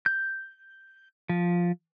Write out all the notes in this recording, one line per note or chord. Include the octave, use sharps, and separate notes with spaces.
G6
F3